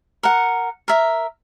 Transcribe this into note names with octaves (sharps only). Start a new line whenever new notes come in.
A#4 F#5
A#4 E5